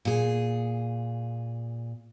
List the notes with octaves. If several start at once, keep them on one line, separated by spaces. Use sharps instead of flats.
A#2 G#4